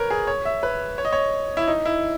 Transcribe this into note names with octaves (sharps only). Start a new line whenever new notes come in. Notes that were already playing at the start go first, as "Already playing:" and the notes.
Already playing: A#4 B4 C#5
G#4
C#5
E5
B4
C#5
D#5
C#5
E4
D#4
E4